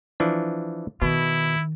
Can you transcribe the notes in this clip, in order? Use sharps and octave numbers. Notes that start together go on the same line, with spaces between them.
E3 F3 D4
B2 D#3 E4